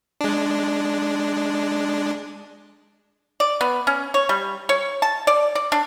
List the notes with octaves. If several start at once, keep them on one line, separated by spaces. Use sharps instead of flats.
G#3 D4
D5
B3
C#4
C#5
G3
C#5
A5
D5
D5
D4